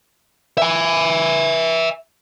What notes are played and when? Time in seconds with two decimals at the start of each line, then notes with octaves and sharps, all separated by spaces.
0.58 E5 G#5